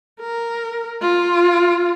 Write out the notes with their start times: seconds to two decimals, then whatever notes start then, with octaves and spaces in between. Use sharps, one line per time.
0.20 A#4
1.02 F4